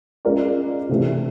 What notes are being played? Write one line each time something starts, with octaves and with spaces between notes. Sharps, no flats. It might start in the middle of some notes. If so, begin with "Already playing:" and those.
G#3 C#4 F4 A#4 D5
C3 E3 A3